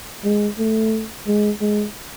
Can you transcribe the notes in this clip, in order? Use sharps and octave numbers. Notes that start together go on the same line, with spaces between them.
G#3
A3
G#3
G#3